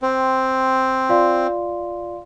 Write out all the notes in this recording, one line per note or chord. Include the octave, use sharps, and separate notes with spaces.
C4 C5 G5 C6
F4 D5 F5 C6